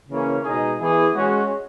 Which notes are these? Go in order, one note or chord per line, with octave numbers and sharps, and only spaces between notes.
C#3 E3 A#3 C#4
B2 G#3 D#4 G#4
E3 B3 E4 G#4
G#3 C#4 F#4